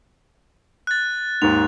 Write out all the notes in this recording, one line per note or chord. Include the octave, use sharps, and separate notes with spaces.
F#6 A6
D#2 G#2 F7